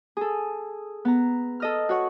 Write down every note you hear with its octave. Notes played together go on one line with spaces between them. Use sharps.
G#4 A4
B3 A#5
A4 D#5 F6
F#4 C#5 F#5